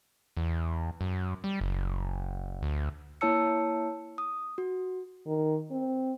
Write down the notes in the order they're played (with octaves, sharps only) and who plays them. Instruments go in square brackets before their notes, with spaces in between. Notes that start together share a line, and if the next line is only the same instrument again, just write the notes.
[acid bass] E2
F#2
G3
F#1
D2
[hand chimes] A#3 E4 C#5 A5 E6 C#7
D#6
F#4
[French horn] D#3
C4